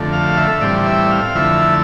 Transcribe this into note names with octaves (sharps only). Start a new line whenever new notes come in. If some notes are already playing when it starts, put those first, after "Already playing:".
Already playing: F2 D3 A3
F5
E5
A2 E3 G3 C4 D5
E5
F5
F2 D3 A3 E4 E5